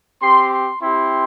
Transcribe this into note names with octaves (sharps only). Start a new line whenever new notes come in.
C4 G4 C6
C6
C4 E4 G4 C6